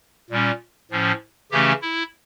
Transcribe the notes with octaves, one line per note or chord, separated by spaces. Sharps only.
A#2 G3 C#4
A2 F3 C#4
C#3 E3 A3 C#4 G4
E4